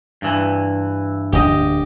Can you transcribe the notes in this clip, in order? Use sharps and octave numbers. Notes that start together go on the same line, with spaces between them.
G2 E3
D1 D4 G4 D#5